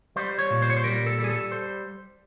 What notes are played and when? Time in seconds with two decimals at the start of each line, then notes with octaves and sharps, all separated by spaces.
0.16 G3 C5
0.39 C#5
0.51 A#2
0.62 C5
0.70 C#5
0.77 C5
0.84 G3 A#4
1.07 A4
1.19 G3
1.24 G#4
1.30 A4
1.52 C5